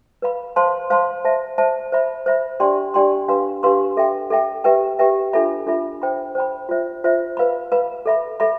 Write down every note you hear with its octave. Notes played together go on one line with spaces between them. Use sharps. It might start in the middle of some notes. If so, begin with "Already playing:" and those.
B4 F5 B5
C5 F5 A5 C6
C5 F5 A5 C6
C5 E5 A5
C5 E5 A5
C5 E5 B5
C5 E5 B5
D4 G4 D5 G5 C6
D4 G4 D5 G5 C6
D4 G4 B4 F5 C6
D4 G4 B4 F5 C6
A4 E5 G5
A4 E5 G5
G4 B4 E5 G5
G4 B4 E5 G5
D4 F4 A4 E5 B5
D4 F4 A4 E5 B5
C5 G5 B5
C5 G5 B5
F4 C5 E5
F4 C5 E5
B4 F5 B5
B4 F5 B5
A4 E5 B5
A4 E5 B5